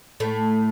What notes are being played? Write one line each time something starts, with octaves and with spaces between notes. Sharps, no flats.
A2 A3